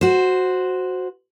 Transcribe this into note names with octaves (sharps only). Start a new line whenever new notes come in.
F#4 C5